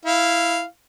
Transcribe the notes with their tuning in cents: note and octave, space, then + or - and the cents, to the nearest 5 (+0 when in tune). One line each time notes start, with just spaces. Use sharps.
E4 +0 F5 -10